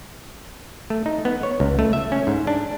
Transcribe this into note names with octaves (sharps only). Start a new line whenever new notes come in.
A3
D#4
B3
C#5
C#2
A3
E5
C#4
G#2
D4